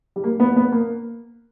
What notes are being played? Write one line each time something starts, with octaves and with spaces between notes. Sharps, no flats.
G3
A#3
B3
B3
A#3